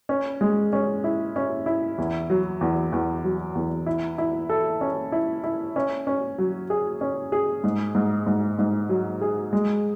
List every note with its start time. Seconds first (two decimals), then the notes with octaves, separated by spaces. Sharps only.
0.09 C#4
0.41 G#3
0.73 C#4
1.04 E4
1.36 C#4
1.66 E4
1.98 E2
2.30 F#3
2.61 E2
2.92 E2
3.24 F#3
3.55 E2
3.86 E4
4.18 E4
4.49 A4
4.81 C#4
5.12 E4
5.44 E4
5.76 C#4
6.07 C#4
6.38 F#3
6.70 G#4
7.01 C#4
7.32 G#4
7.64 G#2
7.95 G#2
8.27 G#2
8.59 G#2
8.89 F#3
9.21 G#4
9.53 G#3